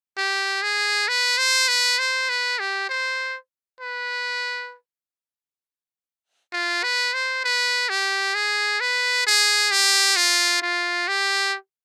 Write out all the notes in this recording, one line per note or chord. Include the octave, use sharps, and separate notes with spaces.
G4
G#4
B4
C5
B4
C5
B4
G4
C5
B4
F4
B4
C5
B4
G4
G#4
B4
G#4
G4
F4
F4
G4